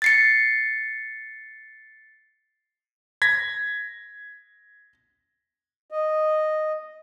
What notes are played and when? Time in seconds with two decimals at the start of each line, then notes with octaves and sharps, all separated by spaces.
0.02 A6 C7 C#7
3.22 G#6 A#6 B6
5.91 D#5